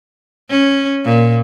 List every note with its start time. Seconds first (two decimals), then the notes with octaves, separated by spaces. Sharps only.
0.50 C#4
1.05 A#2